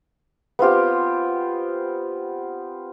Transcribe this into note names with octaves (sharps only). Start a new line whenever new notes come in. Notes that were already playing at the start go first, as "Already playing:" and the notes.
B3 C4 F4 G4